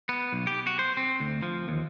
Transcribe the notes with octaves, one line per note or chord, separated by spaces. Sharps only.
B3
B1
G4
F#4
C5
C4
D2
F3
D#2